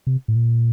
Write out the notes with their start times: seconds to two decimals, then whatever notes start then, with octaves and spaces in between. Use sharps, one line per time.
0.07 C3
0.28 A2
0.36 A#2